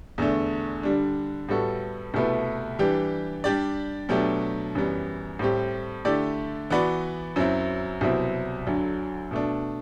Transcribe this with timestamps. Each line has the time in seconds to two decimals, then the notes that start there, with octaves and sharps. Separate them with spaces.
0.18 E2 D3 A3
0.83 D3 G3 D4
1.49 A2 G3 B3 F#4 A4
2.14 C2 B2 A3 E4 B4
2.79 E3 G3 D4 G4
3.44 G3 D4 G4 D5
4.09 B2 F#3 A3 D4 G4
4.75 F#2 E3 G3 B3
5.39 A2 G3 C4 G4
6.05 D3 A3 E4 G4 D5
6.70 E3 B3 F#4 B4 D5
7.36 F#2 F#3 C4 E4
8.01 C2 B2 F#3 C4 E4
8.66 D2 D3 F#3
9.31 B2 A3 D4